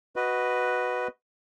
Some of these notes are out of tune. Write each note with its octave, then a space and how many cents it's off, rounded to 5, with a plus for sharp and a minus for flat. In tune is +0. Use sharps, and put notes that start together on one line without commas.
F#4 +0 B4 +0 D#5 +0